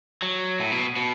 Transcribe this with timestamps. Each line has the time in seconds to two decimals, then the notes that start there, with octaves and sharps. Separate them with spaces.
0.22 F#3
0.60 A2
0.72 B2
0.96 B2